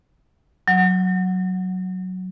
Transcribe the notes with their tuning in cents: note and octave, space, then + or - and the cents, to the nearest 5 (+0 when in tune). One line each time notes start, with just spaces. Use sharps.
F#3 +0 F#5 +0